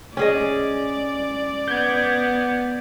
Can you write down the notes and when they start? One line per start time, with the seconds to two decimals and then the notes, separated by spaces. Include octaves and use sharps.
0.17 C#4 G#4 D5 D#5
1.68 B3 G6 G#6